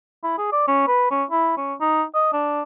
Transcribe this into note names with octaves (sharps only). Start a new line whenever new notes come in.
E4
G#4
D5
C#4
B4
C#4
E4
C#4
D#4
D#5
D4